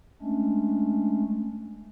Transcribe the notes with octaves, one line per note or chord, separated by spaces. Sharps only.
G#3 A3 C#4 D4